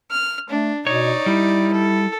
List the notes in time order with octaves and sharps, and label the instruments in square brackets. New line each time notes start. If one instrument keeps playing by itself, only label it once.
[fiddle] F6
[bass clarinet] A3 [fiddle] D4
[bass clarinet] B2 [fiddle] D#4 D5 [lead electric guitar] C#5
[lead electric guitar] G3 [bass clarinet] E4
[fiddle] A4